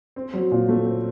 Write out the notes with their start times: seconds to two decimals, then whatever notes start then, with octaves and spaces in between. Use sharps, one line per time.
0.16 C4
0.33 F#3
0.51 A#2
0.69 A3
0.86 C4